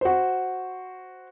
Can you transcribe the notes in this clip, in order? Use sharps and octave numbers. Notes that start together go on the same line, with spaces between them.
F#4 C5